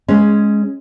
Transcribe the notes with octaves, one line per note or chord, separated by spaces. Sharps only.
G#3 C#4